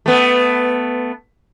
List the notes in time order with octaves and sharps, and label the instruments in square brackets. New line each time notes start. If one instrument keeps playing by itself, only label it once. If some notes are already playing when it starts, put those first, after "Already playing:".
[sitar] A3 B3